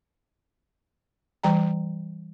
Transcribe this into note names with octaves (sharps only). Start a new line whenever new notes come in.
E3 G3 G5 A#5